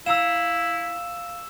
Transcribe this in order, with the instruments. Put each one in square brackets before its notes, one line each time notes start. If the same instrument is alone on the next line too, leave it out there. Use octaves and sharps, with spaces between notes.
[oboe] E4 [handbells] F5 A#5 [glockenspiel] E6 E7